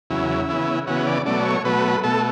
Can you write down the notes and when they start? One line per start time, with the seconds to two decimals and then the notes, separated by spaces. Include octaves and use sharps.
0.10 E2 C#3 F#3 E4
0.48 C#3 E3 B3
0.87 C#3 E3 B3 F#4
1.07 D5
1.26 B2 F#3 A3 D5
1.45 C#5
1.65 B2 F#3 A3 B4
2.03 B2 A3 A4